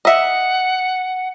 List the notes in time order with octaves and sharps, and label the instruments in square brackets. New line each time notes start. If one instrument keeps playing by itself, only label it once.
[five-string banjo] D#5 E5 [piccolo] F#5